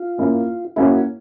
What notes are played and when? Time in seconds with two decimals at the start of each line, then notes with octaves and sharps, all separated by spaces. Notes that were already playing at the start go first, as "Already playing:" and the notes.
Already playing: F4
0.18 A#3 C#4 E4
0.76 A#3 C#4 E4 F#4